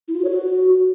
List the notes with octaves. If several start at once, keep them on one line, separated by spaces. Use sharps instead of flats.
E4
F4
F#4
C#5
F#4